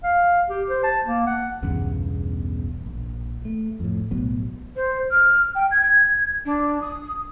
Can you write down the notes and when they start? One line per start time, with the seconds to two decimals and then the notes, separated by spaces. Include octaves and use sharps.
0.04 F5
0.49 G4
0.70 C5
0.84 A5
1.06 A#3
1.27 F#5
1.62 B1 E2 G2 C#3
2.86 A#1
3.45 A3
3.80 F2 A2
4.11 B1 A2 F#3 B3
4.76 C5
5.11 F6
5.55 G5
5.71 G#6
6.46 D4
6.81 D#6